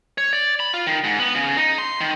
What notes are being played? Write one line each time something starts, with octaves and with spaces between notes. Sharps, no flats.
C#5
D5
B5
F4
D#3
G#2
B3
C#3
D#4
C6
D#3